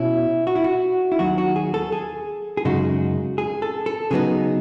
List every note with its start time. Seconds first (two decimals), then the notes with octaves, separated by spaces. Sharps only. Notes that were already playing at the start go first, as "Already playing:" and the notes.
Already playing: B2 C#4 E4
0.47 F#4
0.56 E4
0.64 F#4
1.12 E4
1.19 D#2 D#3 F#3 F#4
1.38 F#4
1.56 G#4
1.74 A4
1.92 G#4
2.57 G#4
2.65 F#2 C#3 G#3 D#4 F#4
3.38 G#4
3.62 A4
3.86 A4
4.11 C#3 F#3 B3 D#4 G#4